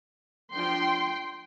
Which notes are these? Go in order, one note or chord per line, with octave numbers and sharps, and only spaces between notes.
F3 D4 G5 C6